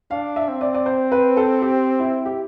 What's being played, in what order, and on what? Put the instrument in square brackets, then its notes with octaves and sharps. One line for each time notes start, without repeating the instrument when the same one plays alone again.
[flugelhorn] D4 [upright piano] F5
[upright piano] E5
[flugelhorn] C4
[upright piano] D5
D5
C5
B4
A4
G4
E4
G4